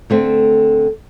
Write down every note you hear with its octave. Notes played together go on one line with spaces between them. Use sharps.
D3 A3 C4